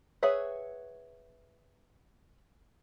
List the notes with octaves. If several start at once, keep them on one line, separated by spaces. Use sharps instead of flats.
G#4 B4 C#5 E5 F#5